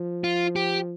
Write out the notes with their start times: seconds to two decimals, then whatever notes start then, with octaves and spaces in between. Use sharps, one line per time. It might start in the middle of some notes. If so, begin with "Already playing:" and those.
Already playing: F3
0.24 F4
0.56 G4